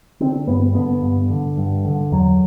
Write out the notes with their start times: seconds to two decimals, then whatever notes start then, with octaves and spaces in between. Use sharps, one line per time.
0.20 D3 C4
0.47 G2 B3
0.74 D3 B3
1.02 G2
1.30 D3
1.57 G2
1.85 D3
2.12 E2 F#3